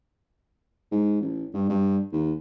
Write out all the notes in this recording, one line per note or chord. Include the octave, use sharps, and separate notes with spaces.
G#2
A1
G2
G2
D#2